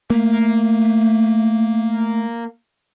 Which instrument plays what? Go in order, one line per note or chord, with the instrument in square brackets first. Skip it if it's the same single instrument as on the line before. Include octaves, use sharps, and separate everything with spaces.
[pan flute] A3 [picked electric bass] A#3